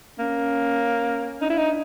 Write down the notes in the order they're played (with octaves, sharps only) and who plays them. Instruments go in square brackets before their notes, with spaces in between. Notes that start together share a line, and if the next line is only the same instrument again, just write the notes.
[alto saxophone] A#3 [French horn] C#4
[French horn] D4 [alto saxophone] D#4
[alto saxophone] E4
D#4